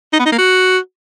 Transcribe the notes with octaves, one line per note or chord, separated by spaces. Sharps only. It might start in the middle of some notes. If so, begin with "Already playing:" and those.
D#4
B3
D#4
A#3
F#4